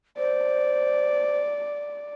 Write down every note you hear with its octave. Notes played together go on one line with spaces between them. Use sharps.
C5 D5